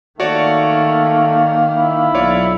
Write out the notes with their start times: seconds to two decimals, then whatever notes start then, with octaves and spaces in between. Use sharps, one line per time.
0.20 D#3 A3 A#3 F#4 C#5 D5
1.77 E4
2.14 B1 F4 C#5 D5